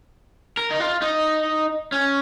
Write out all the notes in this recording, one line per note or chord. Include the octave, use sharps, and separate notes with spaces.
A#4
D#4
F4
D#4
C#4